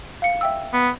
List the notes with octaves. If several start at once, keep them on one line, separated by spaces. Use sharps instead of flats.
F5 C#7
E5 G5 E6
B3